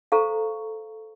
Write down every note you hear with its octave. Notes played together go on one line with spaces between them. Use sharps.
A4 C5 F5 A#5 C#6